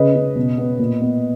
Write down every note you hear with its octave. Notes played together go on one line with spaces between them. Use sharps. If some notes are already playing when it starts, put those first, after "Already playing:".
Already playing: C#3 B4 D#5
C#3
B2
B3
A#2
B3